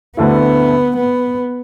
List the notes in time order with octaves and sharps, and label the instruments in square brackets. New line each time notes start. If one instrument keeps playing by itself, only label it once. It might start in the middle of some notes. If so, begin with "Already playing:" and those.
[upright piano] D2 D3 A3 E4 [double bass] B3
[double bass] B3